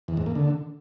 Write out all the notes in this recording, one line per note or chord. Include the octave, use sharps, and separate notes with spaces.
E2
G#2
A#3
D3